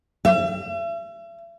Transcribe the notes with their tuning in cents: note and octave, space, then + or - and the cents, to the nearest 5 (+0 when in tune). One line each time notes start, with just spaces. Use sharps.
E5 +40